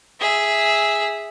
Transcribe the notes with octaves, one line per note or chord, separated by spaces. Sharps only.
G#4 E5